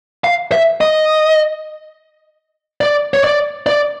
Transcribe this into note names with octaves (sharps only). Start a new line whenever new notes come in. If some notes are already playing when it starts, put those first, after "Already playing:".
F5
E5
D#5
D5
C#5
D5
D5